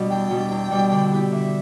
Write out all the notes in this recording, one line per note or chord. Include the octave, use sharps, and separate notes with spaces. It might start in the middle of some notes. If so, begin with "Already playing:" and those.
Already playing: B2 G3 D4
E2 G5
B2 G3 D4
E2
B2 G3 D4
D3
B3 E4 G4
D3 E5